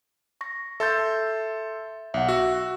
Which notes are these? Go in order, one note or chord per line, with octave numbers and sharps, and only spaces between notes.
C#6 A#6
A4 E5 C6 G6 A6
B1 E5 F#5
F#4 E6